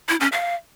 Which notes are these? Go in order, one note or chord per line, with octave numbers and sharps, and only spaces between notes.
E4
C#4
F5